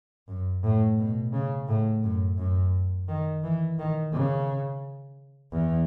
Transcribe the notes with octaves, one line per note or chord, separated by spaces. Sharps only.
F#2
A2
B2
C#3
A2
F#2
F#2
D#3
E3
D#3
C#3
E2